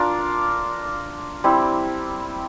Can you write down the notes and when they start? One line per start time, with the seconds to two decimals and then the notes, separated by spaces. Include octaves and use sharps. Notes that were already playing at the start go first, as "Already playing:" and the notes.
Already playing: D4 F4 A#4
1.44 G3 C4 E4